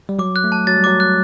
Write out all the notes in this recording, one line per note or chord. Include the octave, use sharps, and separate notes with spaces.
G3
F#3 D6
F#6
A3
A5
F#3 A6
G3
F#3 D6
F#6